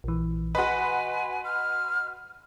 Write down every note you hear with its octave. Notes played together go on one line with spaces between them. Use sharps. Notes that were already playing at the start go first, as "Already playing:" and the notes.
A#1 E3
F#4 B4 D#5 G#5 C6
F6